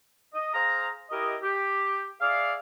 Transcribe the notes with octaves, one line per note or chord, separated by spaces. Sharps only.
D#5
G#4 C5 F5 A#5
E4 G4 A#4 D#5
G4
G#4 D5 E5 F5